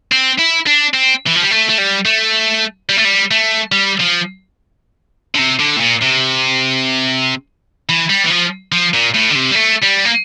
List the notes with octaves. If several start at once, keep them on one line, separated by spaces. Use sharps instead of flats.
C4
E4
D4
C4
E3
F3
G3
A3
A3
G3
A3
G3
A3
G3
A3
G3
F3
D3
C3
D3
A2
A#2
C3
E3
G3
E3
F3
F3
A#2
A2
D3
C3
G3
A3
G3
A#3